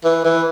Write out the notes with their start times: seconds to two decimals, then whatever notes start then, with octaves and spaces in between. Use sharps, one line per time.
0.04 E3
0.25 E3